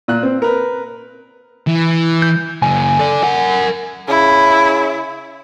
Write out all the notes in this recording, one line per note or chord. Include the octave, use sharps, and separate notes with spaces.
A#2 F#6
C4
A#4 B4
E3
G6
F#2 C#3 G#5
A4 D5
A#4 F#5
C#3 E4